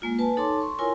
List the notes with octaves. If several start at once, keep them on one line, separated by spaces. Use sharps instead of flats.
G#3 A#3 F4
B4 G#5 A5
D#4 A4 C#5 A5 C6 D6
C6 C#6
E4 F4 A#4 C#5 G#5 C6